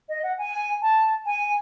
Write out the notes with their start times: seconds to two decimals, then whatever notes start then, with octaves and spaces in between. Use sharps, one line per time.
0.09 D#5
0.23 F#5
0.38 G#5
0.82 A5
1.26 G#5